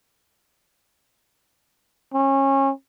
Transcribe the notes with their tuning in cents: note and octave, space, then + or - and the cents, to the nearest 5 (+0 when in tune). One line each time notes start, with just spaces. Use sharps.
C#4 -25